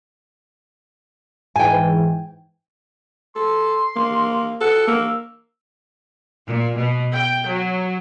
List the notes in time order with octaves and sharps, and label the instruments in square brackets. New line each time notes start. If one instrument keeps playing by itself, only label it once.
[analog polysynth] G#2 E3 [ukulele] G5 G#5
[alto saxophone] A4 [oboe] C6
[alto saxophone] A#3
[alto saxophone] A4 [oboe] F#5
[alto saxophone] A#3 [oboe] E6
[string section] A#2
B2
G5
F#3